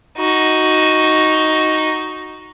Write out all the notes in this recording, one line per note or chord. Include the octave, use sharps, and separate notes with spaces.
D#4 F#4